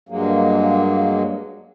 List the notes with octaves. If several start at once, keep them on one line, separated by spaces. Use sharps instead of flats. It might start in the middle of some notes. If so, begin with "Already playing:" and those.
G2 F#3 G#3 A#3